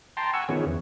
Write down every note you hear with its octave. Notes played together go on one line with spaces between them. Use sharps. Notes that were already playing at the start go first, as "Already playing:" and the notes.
G5 A5 A#5 C6
F#5 G#5 C#6 E6
D#3 F3 B3 C#4 G#4 C#5
E2